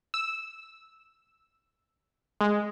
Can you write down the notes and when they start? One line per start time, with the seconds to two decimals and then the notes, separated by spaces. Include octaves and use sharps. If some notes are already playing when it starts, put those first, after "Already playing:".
0.14 E6
2.41 G#3